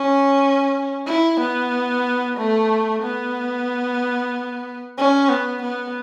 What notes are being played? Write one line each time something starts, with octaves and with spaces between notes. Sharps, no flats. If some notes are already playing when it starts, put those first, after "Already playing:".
Already playing: C#4
E4
B3
A3
B3
C#4
B3
B3